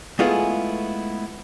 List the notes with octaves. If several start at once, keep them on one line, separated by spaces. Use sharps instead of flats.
G#3 A3 B3 E4 F4 G#4